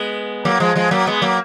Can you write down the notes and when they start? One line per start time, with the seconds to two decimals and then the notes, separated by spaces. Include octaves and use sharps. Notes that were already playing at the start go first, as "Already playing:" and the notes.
Already playing: G#3 B3
0.45 F#3 A#3
0.60 F3 G#3
0.76 F3 G#3
0.91 F#3 A#3
1.07 G#3 B3
1.22 F#3 A#3